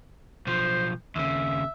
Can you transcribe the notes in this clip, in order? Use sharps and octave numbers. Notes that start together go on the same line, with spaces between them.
B1 F3 C5
D#2 C#3 E5